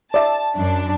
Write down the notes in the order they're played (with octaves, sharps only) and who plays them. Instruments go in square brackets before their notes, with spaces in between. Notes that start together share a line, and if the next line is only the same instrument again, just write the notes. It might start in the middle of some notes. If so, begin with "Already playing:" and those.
[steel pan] D5 E5 [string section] A5
[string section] F#2 D4